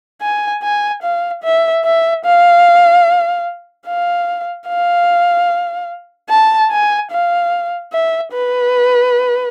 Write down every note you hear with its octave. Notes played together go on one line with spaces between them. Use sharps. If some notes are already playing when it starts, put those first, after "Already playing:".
G#5
G#5
F5
E5
E5
F5
F5
F5
A5
G#5
F5
E5
B4